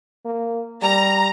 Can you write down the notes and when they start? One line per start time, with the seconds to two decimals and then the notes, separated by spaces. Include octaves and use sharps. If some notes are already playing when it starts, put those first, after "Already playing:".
0.25 A#3
0.83 G3 A#5